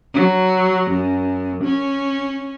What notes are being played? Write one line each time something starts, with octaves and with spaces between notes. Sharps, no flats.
F#3
F#2
C#4